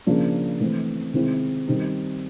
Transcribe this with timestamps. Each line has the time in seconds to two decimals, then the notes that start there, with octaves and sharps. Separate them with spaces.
0.06 C#3 F3 A#3 D4
0.61 E3 A3 C4
1.14 C3 D#3 G#3 C4 E4
1.68 D#3 G3 C4 D#4